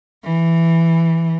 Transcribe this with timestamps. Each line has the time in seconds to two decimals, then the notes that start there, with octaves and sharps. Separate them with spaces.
0.23 E3